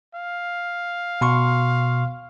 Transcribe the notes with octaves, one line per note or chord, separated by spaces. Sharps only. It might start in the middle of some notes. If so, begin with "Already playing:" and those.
F5
B2 C6 C#6